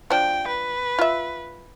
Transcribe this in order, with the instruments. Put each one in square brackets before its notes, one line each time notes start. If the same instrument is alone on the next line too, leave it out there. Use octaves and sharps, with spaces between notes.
[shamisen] F3 D4 [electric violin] G5
[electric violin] B4
[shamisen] F4 E5